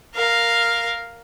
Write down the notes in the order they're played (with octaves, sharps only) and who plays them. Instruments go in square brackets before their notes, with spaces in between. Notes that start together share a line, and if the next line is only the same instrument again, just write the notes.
[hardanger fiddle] A#4 F5